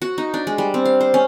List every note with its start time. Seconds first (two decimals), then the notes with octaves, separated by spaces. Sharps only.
0.02 F#4
0.18 D#4
0.34 D4
0.47 G#3
0.58 G3
0.74 C4
0.85 F5
1.01 C5
1.14 C#4